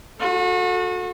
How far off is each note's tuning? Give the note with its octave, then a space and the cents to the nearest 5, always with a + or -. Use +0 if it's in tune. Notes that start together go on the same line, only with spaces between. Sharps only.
F#4 -35 A4 +0